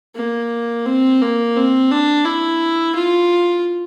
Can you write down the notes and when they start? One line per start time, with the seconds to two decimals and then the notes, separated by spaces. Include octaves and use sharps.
0.16 A#3
0.86 C4
1.22 A#3
1.56 C4
1.91 D4
2.25 E4
2.95 F4